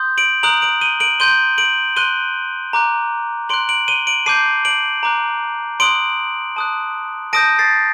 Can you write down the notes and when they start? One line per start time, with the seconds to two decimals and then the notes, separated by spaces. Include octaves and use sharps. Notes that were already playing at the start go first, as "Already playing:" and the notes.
Already playing: C6 D#6 G6
0.18 D7 F#7
0.43 A#5 D#6 F#6 D7 F#7
0.62 D7 F#7
0.81 D#7 G7
1.00 D7 F#7
1.20 C6 G6 D#7 G7
1.58 D7 F#7
1.96 C6 F#6 D#7 G7
2.73 A#5 D6 F#6
3.49 C6 F#6 D7 F#7
3.69 D7 F#7
3.88 D#7 G7
4.07 D7 F#7
4.26 A5 D6 G6 C7 D#7
4.65 D7 F#7
5.03 A#5 D6 F#6
5.80 C6 D#6 F#6 D7 F#7
6.57 A5 D#6 F#6
7.33 A5 D#6 G6 A#6 D7
7.59 A6 C7